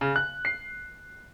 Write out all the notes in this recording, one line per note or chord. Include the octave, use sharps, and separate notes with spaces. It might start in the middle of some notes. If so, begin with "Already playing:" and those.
C#3
F#6
C7